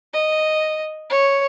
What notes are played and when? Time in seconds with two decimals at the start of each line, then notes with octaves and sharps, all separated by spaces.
0.14 D#5
1.10 C#5